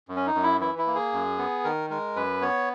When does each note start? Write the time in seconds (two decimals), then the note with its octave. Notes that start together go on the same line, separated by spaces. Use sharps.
0.09 F#2
0.16 C#4
0.26 D#4
0.35 F#2
0.43 E4
0.61 E3 E4
0.78 E4
0.87 A#3
0.95 G#4
1.13 F#2
1.38 B3
1.64 D#3 A#4
1.90 G#3 A#4
2.16 F#2 B4
2.41 B3 C#5